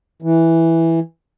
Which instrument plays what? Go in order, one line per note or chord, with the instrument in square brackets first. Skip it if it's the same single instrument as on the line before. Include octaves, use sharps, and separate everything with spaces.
[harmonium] E3